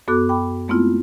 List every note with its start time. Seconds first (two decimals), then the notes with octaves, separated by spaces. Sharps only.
0.08 F#2 B3 F#4 A4 D6 F#6
0.29 G5 B5 D6
0.68 G#3 A3 B3 C4 E4 F4